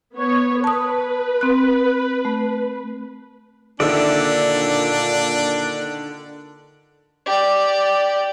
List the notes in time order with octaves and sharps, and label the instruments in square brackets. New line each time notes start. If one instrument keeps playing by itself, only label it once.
[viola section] B3 C#5
[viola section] B4 [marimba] A5 D#6
[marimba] C4 F#6
A3
[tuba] A#2 [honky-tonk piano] D3 D#3 [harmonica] D4 [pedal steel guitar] D5 E5
[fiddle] G4 D5